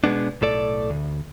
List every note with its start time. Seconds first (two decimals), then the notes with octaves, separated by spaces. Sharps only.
0.04 B2 G#3 B3 D4
0.41 B1 A2 A4 D5
0.90 D2